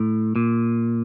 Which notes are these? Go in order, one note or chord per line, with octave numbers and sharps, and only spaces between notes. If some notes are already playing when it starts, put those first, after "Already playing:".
Already playing: A2
A#2